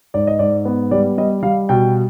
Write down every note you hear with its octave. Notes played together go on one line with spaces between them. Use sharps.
G#2 D5
D#5
G#2 D5
B3
G3 D5
G3 D#5
G3 F5
B2 G5